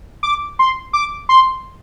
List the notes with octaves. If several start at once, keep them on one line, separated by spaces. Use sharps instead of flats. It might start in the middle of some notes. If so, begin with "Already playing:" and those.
D6
C6
D6
C6